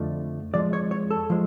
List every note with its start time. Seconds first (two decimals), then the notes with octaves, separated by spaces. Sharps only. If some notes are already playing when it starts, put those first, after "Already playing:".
Already playing: F2 D3 F3 A3
0.53 F2 F3 G#3 D5
0.73 C#5
0.91 C#5
1.11 A4
1.30 F3 G#3